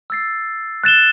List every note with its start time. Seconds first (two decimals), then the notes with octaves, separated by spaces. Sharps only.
0.10 E6 A6 C7
0.84 F#6 A6 E7 G7